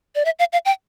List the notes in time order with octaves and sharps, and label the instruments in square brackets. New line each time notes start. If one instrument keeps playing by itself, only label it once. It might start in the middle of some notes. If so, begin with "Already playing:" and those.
[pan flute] D5
E5
F5
F5
G5